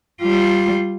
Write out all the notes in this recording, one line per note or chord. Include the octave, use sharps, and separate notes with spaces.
G3 F4